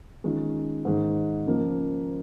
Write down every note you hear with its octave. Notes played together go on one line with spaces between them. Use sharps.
D#3 G#3 C#4 F4
G#2 D#3 G#3
C#3 F3 A#3